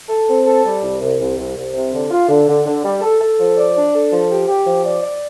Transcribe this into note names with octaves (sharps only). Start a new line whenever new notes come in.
A4
C4
A4
G3
C2
C2
C2
C2
C2
C3
D3
F4
D3
D3
D3
G3
A4
A4
F3
D5
D4
A4
F3
G4
G4
F3
D5
D5